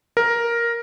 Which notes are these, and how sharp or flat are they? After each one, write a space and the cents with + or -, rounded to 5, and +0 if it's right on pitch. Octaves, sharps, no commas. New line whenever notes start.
A#4 +5